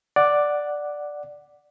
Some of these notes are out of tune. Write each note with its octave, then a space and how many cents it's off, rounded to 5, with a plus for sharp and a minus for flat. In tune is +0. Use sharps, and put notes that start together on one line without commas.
D5 +0 F#5 +0